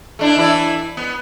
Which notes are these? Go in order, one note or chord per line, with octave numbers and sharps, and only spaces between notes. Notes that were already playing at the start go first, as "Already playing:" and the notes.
A3 D4 E4
E3 E4 D5
B3